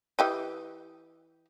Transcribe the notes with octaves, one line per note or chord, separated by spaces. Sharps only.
E3 G4 D#5